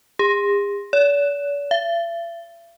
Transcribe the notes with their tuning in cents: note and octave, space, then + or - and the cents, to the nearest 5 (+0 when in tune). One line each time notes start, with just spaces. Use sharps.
G#4 -45
D5 -45
E5 +45